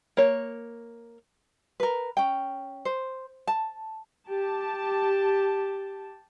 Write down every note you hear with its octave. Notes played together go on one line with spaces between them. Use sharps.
A#3 C#5
A#4 B4
C#4 G5
C5
A5
G4 A5